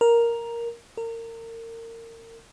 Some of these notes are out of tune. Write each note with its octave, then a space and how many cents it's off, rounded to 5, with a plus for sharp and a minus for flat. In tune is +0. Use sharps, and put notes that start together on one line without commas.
A#4 +5
A#4 -30